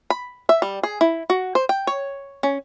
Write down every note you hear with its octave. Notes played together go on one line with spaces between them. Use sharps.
B5
E5
G3
G#4
E4
F#4
C5
G5
C#5
C#4